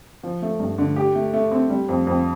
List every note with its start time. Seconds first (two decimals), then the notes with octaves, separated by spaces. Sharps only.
0.23 F3
0.42 A3
0.60 G2
0.78 D3
0.96 G4
1.15 A3
1.33 A3
1.51 C4
1.70 G3
1.89 F2
2.07 F2